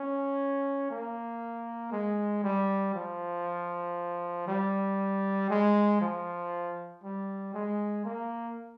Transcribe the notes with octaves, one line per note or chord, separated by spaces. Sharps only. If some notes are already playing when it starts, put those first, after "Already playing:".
Already playing: C#4
A#3
G#3
G3
F3
G3
G#3
F3
G3
G#3
A#3